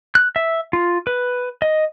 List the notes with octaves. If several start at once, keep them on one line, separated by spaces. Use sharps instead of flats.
F#6
E5
F4
B4
D#5